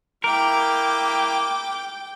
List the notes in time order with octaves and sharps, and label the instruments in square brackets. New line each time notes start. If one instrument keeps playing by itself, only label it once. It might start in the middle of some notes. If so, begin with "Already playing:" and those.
[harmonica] A#3 E4 F6 [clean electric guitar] A#4 [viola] G5 [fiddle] D6